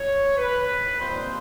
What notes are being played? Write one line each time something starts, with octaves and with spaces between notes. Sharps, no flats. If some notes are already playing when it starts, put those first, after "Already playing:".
Already playing: C#5
B4
A#2 G3 C4 D#4 C5